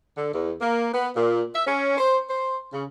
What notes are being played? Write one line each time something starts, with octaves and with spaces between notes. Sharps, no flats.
D3
E2
A#3
B3
A#2
E5
C#4
C5
C5
C#3